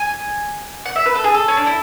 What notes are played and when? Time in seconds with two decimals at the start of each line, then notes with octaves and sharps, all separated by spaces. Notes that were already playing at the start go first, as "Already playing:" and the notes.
Already playing: G#5
0.85 F#5
0.96 E5
1.06 B4
1.15 A4
1.24 G#4
1.34 A4
1.48 C#4
1.57 D4
1.66 E4